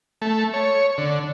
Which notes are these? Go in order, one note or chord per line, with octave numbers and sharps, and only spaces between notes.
A3
C#5
D3